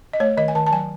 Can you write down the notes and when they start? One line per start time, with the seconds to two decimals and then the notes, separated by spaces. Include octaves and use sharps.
0.13 D#5
0.20 A3 C#5
0.37 D#3 D#5
0.48 G#5
0.55 D#3 A5
0.67 A5
0.72 F#3 G#5